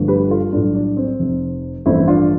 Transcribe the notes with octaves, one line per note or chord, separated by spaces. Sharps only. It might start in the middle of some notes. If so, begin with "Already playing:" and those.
Already playing: G1 G2 F3 A3
G4 B4
F4 A4
B1 A2 G3 D4 F4
D4
C4
F1 F2 C3
A1 G2 F3 A3 C4 E4
D4 F4